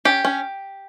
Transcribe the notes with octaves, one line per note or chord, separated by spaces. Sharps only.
C#4 G4
C#4